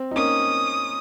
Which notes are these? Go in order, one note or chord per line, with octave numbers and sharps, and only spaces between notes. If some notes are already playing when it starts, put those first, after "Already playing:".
Already playing: C4
D#4
A#3 C#4 D#6